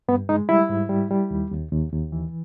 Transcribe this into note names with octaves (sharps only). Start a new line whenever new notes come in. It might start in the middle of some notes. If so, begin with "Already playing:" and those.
G2 B3
G#3 D#4
G3 E4
G#2
G3
G3
D#2
D#2
D#2
D#2
E3